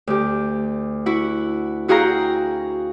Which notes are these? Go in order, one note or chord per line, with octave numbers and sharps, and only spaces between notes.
D2 G4
E4 F#4 F#5
E4 F#4 G#4 F5 G5 A#5